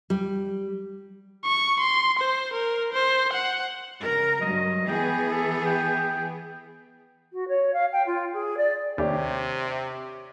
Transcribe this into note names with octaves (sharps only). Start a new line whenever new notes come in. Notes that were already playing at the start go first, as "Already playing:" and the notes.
G3
C#6
C6
C5
A#4
C5
F#5
C#3 A#4
G2 F#3 D#5
E3 B3 G#4 G5
A4
G5
F#4
C#5
F5
G5
F4
G#4
D5
D#2 C3 D4 G4 C#5